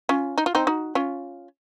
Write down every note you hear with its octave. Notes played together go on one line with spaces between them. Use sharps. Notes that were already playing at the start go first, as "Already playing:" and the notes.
C#4 F4
D#4
F4
C4 D#4
D#4 F#4
C#4 F4